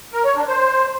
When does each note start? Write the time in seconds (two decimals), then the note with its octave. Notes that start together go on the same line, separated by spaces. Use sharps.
0.13 A#4
0.25 C#5
0.36 D4
0.48 C5